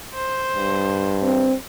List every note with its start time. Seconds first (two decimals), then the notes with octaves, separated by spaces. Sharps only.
0.15 C5
0.56 G2
1.22 C4